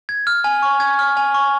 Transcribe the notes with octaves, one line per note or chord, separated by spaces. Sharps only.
G#6
F6
G#5
C#6
G#6
F6
G#5
C#6